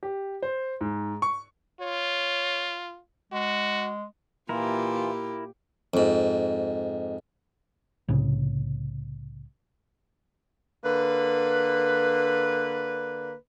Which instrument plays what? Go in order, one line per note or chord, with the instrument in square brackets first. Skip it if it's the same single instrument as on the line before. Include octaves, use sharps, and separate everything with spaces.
[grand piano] G4
C5
G#2
C#6
[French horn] F4 [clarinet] C#5
[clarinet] G#3 [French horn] F#4
[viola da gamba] A#2 G4 [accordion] E3 F4 [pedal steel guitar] E4 A#4
[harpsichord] F2 G#2
[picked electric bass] C2 A2 C#3
[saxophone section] D3 A#3 B4